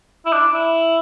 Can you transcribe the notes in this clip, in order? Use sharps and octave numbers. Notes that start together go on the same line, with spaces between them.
E4
D4
E4